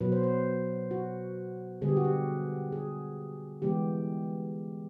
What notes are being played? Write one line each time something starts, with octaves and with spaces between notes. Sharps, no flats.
B2 F#3 B3 B4
C5
C5
F#4
D3 G3 B3 G#4
G4
F#4
G4
G#4
E3 G#3 B3 G4